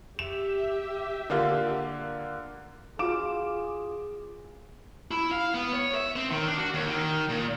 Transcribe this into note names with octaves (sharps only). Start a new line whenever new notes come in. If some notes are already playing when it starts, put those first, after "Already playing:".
G4 E5 E7
D3 A#3 F4
F4 F#4 G#4 F5 D6 D7 E7
E4
F5
B3
C#5
E5
C4
D#3
D4
F#4
D#2
D#3
A#2